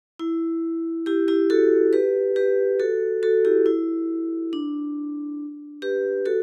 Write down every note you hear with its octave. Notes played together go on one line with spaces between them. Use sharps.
E4
E4 G4
E4 G4
F#4 A4
G4 B4
G4 B4
F#4 A4
F#4 A4
E4 G4
E4
D4
G4 B4
F#4 A4